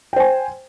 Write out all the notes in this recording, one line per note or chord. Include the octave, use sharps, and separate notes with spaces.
C5 G5 G#5